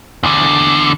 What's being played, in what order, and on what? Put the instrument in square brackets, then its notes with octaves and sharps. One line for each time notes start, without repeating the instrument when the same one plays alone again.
[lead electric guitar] E2 D3